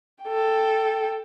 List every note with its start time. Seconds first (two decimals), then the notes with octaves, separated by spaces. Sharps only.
0.24 A4 G5